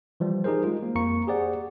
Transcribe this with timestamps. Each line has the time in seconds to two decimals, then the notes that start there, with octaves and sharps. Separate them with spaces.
0.20 E3 F3 G3
0.44 D#4 G4 G#4 A#4 C5
0.64 G#3 F4
0.83 A#3
0.95 F2 A#3 A#5 C#6 C#7
1.27 G4 G#4 C5 D5 F#5